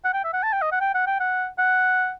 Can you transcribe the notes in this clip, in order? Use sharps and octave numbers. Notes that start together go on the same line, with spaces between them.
F#5
G5
E5
F#5
A5
G5
D#5
F#5
G5
F#5
G5
F#5
F#5